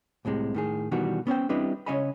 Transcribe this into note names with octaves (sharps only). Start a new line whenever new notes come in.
C2 A2 C3 G#3
A2 D#3 G#4
B2 D#3 E3 G3 F#4
B3 C#4 C5 G5
G3 C4 D4 E4 B4 D#5
C#3 C#4 C#5 D#5 G#5 B5